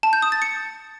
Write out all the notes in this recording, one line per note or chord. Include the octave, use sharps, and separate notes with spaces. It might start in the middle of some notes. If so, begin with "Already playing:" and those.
A5
G6
D#6
A6
C#7